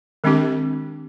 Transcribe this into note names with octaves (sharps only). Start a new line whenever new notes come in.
D#3 G#3 C4 D4 G4